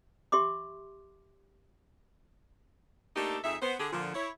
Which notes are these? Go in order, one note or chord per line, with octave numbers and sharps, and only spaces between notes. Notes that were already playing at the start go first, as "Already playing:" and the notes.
G4 E5 C6 D6
A3 A#3 D4 D#4 G4 A4
F2 D#4 G#4 E5
B3 C5
D3 G4 G#4
A#2 D3 F3
E4 C#5